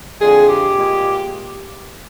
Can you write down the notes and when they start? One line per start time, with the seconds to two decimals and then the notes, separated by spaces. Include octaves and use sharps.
0.20 F2 D3 G#3 G#4
0.48 G4
0.76 A#2 G#3